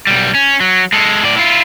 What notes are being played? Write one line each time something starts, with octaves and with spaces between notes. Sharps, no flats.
B1 G3
C#4
F#3
G#3 A4
A2 D5
E4 F4